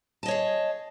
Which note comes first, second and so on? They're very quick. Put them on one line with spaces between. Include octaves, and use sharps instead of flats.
A5 D#5 C#5 G#4